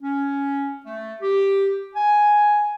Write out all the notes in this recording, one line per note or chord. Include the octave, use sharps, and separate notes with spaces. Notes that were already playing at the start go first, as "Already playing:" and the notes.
C#4
A3
G4
G#5